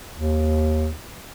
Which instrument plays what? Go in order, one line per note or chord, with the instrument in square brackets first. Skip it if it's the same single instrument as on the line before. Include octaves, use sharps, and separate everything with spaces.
[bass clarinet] D#2